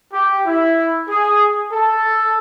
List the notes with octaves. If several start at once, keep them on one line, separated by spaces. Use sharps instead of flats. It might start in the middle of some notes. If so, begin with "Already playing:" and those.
G4
E4
G#4
A4